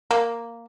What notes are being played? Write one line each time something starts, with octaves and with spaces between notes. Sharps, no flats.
A#3